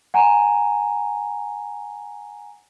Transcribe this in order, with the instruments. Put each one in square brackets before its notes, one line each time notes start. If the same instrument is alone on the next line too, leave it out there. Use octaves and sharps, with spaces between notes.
[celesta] F#5 G#5 A#5